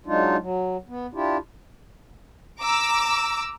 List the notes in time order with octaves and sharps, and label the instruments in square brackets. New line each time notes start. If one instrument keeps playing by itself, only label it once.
[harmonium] F#3 G#3 D4 D#4 F4
F#3
B3
D4 E4 F4 G4
[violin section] A#5 D6 E6